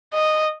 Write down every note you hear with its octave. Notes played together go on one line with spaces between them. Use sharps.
D#5